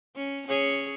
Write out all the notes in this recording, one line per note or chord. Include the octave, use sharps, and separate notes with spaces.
C#4
C#4 G#4 C#5